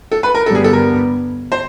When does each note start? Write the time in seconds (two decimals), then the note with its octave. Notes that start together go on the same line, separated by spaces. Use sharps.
0.12 A4
0.23 B4
0.34 A#4
0.46 G2 D3 G3 B3 A4
0.55 G#4
0.64 A4
0.73 A#4
1.52 C5